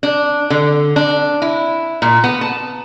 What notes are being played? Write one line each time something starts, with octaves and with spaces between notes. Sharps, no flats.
D4
D3
D4
E4
A#2
B3
A5